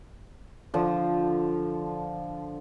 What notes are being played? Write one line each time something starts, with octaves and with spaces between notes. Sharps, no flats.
D3 F3